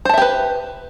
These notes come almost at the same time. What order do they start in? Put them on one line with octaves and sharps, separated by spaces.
C5 A5 E5 G4 B4